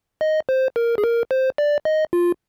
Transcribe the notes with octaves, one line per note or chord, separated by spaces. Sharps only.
D#5
C5
A#4
G#4
A#4
C5
D5
D#5
F4